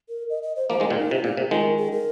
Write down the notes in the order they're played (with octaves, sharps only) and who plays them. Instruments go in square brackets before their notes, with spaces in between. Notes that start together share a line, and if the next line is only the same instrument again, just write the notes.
[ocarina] A#4
D#5
D#5
C5
[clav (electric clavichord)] F3 A#3 [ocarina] C5
[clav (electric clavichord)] D#3 G#3 [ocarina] D#5
[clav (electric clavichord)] A#2 D#3
[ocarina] D#4
[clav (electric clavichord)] C3 [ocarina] F4
[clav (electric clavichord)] A#2 [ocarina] G#4
[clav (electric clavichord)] C3
[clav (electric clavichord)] D#3 G#3 [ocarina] F4
[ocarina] G#4
A#4